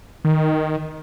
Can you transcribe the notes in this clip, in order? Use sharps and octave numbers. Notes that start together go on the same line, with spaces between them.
D#3